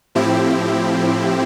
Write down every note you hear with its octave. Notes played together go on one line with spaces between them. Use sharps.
A2 F3 C4 E4 G4